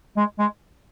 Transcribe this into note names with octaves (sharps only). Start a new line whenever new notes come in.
G#3
G#3